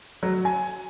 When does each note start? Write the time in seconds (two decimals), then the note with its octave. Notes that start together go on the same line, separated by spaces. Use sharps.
0.23 F#3
0.45 G#5